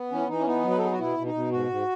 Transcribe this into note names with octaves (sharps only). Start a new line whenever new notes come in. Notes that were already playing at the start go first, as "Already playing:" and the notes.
Already playing: B3
E3 C#4
E3 D#4
C#4
B3 D#4
F#3
B4
A4
B3 G#4
F#4
B2 E4
B2
D#4
B2
G#2 F#4
G#2